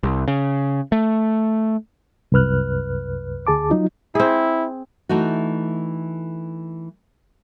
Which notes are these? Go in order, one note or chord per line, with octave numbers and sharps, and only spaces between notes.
C2
C#3
A3
C2 F#2 B4 F6 F#6
D2 G#4 A5 D6
F#3 D#4 F4
C4 E4 G#4
E3 A3 D#4 F#4